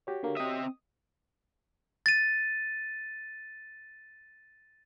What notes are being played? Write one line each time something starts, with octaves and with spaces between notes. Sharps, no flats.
F#4 G4 C#5
D3 A#3
C4 D#5 E5 D#6
A6 D#7